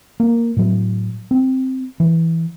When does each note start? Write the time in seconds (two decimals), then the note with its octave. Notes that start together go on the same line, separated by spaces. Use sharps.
0.20 A#3
0.57 A2 F#3
1.31 C4
2.00 E3